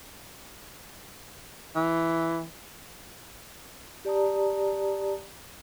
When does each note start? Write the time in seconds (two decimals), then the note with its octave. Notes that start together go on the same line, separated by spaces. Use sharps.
1.76 E3
4.05 G4 D5 A5 A#5 D#6